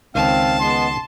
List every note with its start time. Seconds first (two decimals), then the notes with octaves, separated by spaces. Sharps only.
0.15 C#2 D#3 C4 F5 A5
0.60 G#3 B3 C6